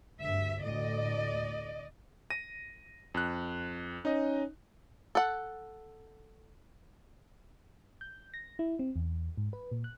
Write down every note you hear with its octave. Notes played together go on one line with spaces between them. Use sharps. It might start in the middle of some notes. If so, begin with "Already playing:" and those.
D2 G2 E5
D2 A2 D5 D#5
A#6 D#7
F2 F#6
C#4 D#4 D#5
A4 F#5
G6
A#6
E4
C4
E2
G#2
B4
A#2
F#6